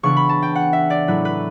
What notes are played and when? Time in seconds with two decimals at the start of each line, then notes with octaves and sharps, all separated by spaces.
0.03 C#3 E3 B3 D4 C#6
0.17 B5
0.29 A5
0.42 G5
0.55 F#5
0.73 E5
0.90 D5
1.07 A2 F#3 A3 E4 B4
1.25 B4